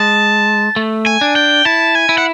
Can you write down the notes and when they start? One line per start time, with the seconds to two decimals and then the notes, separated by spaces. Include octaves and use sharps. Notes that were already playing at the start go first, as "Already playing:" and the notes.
Already playing: G#3 A5
0.76 A3
1.07 G#5
1.21 D4
1.36 G5
1.65 E4 A5
1.95 G#5
2.09 E4
2.18 F#5